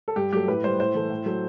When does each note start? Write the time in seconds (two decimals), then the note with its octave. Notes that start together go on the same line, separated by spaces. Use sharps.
0.08 A4
0.16 G2 G4
0.33 F#3 A3 G4
0.48 A2 B4
0.64 G3 C5
0.79 A2 C5
0.95 E3 A3
1.10 A2
1.26 F#3 A3